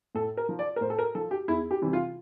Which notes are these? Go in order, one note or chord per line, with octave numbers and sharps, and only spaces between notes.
A2 A4
A#4
F3
D5
A#4
A2 C5
A4
A#4
F3 A4
G4
E2 E4
G4
C3 E3 G3
F4